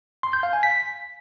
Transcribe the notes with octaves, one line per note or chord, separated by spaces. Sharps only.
C6
G6
F5
G#5
B6